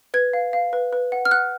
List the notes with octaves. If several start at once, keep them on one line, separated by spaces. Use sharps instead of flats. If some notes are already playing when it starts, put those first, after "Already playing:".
B4 G#6
F5
F5
B4
B4
F#5
F6
F#5 F#6